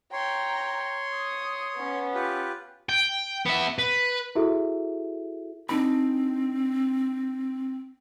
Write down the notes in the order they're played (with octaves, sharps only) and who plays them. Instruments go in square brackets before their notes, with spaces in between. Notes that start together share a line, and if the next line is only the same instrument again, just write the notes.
[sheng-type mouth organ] C#5 C6 [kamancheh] G5 A#5
[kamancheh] D#6
B3 C#4
[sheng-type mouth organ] F4 G4 B4
[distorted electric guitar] G5
B3 E5
B4
[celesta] E4 F#4 G#4 A4 E5
[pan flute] C4 [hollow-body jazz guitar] D4 D#4 B5